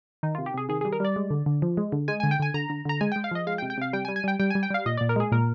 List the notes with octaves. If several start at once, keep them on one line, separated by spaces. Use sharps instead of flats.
D#3 D#4
C3 F4
G4
C3 G#4
D#3 G#4
G3 G#4
A#4
G3 D5
G#3
D3
D3
F3
G#3
D3
G#3 G#5
D3 G#5
G5
D3 G#5
D3 A#5
D3
D3 A#5
G#3 G#5
G#3 G5
F5
F3 D#5
G#3 F5
G5
C3
G5
C3 F5
G3 G5
G#5
G3
G#5
G3 G5
G3 G5
G3 G#5
G5
G3 F5
A#2 D#5
A#2 D5
A#4
G#3 G#4
A#2 A#4